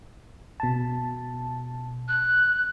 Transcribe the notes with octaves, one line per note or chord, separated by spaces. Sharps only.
B2 A5
F#6